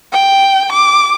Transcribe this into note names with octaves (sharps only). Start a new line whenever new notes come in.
G5
D6